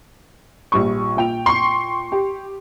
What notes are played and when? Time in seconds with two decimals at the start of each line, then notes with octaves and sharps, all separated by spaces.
0.72 A#1 G3 C#6
1.17 A#2 G5 F7
1.46 C6 C#6
2.12 G4